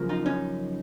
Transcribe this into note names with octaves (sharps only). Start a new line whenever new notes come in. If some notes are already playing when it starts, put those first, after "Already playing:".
Already playing: F#2 C#3 F3 A#3
D#4 F4
C#4 D#4